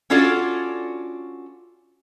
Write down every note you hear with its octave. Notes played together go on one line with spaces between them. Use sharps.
C#4 D4 F4 F#4 A4 D5